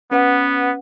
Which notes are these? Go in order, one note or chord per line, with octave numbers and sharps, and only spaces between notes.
B3 C#4 B4 F#5